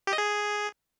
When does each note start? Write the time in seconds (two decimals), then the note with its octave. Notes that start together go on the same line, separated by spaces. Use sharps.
0.07 G4
0.13 D#5
0.18 G#4